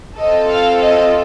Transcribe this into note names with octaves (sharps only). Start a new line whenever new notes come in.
C4 F4 A4 D#5
F5
D#5